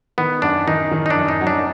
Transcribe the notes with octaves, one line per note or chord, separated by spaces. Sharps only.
D#3 B3
F#2 D4
D#3 D#4
D#3
D#4
D4
F#2
D#4
F#3
D4